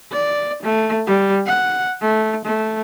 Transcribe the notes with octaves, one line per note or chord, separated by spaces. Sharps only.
D5
A3
G3
F#5
A3
A3